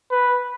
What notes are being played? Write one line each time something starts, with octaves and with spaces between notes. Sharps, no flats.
B4